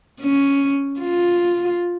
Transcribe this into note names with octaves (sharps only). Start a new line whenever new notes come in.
C#4
F4